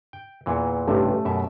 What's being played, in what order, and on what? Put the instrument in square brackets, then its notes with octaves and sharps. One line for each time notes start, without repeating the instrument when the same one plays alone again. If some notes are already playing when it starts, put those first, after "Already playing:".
[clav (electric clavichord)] G5
E2 A#2 E3
[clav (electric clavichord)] A1 G2 C3 [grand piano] A3 C#4 G4
[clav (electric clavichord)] F#2 B2 E5